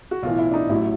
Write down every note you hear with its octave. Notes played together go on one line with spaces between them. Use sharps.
F#4
B1 A2 E3 F4
E4
D4
D#4
A1 A2 F#3 E4